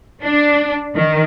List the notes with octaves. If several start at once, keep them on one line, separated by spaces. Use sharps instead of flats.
D4
D#3